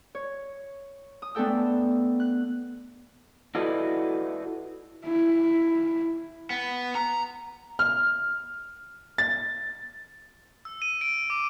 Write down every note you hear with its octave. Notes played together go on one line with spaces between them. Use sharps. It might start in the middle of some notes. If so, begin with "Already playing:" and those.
C#5
D#6
A3 B3 D4 A4 G5 E6
F#6
E4 F#4 A4 B4 D5 D#5
E4
B3
A#5
F6
A6
E6
D#7
D7
D6